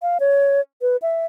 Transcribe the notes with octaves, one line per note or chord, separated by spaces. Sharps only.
F5
C#5
B4
E5